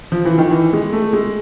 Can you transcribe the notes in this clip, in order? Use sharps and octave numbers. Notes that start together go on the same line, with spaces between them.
F3
E3
D#3
E3
G#3
A3
G#3